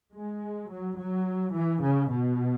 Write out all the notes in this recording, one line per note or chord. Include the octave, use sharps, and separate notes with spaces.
G#3
F#3
F#3
E3
C#3
B2